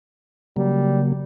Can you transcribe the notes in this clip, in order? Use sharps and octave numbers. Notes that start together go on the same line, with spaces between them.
C#3 F#3 G3 A#3